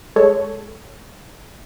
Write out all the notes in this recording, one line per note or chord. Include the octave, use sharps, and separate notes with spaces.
G#3 A4 C#5